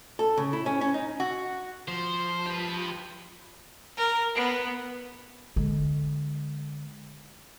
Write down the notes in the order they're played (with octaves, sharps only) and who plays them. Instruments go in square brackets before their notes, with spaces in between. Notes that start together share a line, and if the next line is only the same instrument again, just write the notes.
[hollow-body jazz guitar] A4
C#3
E4
C#4
C#4
D#4
[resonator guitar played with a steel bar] F#4
[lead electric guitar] F3 [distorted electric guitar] C5
[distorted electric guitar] G4 B4
[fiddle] A#4
B3
[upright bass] D3 G#3